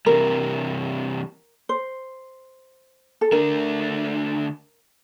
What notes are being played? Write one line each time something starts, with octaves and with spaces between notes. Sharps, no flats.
C3 E3 G3 A#4
C5
A4
D3 A3 D4 A#4